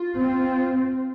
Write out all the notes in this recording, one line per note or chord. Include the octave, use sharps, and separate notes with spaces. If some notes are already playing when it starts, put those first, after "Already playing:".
Already playing: F4
C4